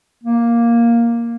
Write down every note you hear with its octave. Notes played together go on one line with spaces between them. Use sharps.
A#3